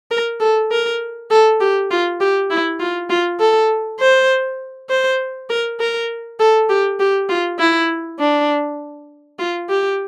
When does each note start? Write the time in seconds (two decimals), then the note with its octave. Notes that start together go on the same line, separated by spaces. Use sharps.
0.11 A#4
0.40 A4
0.71 A#4
1.30 A4
1.61 G4
1.91 F4
2.21 G4
2.50 E4
2.80 F4
3.10 F4
3.40 A4
4.00 C5
4.90 C5
5.50 A#4
5.80 A#4
6.40 A4
6.69 G4
7.00 G4
7.29 F4
7.59 E4
8.19 D4
9.39 F4
9.69 G4